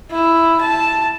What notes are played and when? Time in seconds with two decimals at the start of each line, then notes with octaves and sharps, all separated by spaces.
0.10 E4
0.61 A5